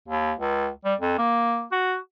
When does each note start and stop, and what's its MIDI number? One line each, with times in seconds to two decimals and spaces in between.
0.08 0.32 39
0.39 0.68 37
0.85 0.94 55
1.00 1.15 41
1.18 1.64 58
1.72 1.96 66